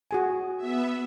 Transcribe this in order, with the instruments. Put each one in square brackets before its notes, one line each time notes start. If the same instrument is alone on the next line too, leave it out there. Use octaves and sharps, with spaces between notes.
[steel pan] F#4 G#4 G#5
[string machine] B3 E5